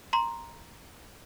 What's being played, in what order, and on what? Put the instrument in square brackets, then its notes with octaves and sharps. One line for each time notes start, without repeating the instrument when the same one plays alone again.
[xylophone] A#5 C6